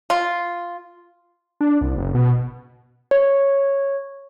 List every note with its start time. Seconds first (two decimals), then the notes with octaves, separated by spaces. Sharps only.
0.10 F4
1.61 D4
1.81 C2
1.96 F#1
2.14 B2
3.11 C#5